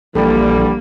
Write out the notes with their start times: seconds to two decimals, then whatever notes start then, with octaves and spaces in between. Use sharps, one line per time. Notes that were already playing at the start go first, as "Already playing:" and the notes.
0.15 A#1 D3 E3 G3 A#3 A4